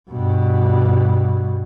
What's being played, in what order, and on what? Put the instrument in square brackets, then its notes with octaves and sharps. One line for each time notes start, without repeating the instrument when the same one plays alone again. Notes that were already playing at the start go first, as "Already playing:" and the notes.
[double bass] G2 B2